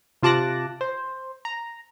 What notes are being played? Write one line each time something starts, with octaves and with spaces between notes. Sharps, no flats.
C3 F4 A5 D6 F#6 A#6
C5
A#5